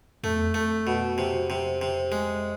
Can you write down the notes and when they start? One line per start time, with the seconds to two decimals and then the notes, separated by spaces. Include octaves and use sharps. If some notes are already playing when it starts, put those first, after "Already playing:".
0.23 F2 A3
0.35 E2
0.46 F2
0.54 A3
0.87 B2
1.18 C3
1.50 C3
1.81 C3
2.12 G#3